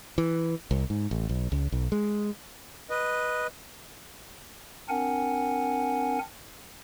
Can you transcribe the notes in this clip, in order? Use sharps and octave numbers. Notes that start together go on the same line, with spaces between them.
E3
C2
G#2
A1
B1
C#2
B1
G#3
B4 D#5
C4 D4 A#4 F#5 G#5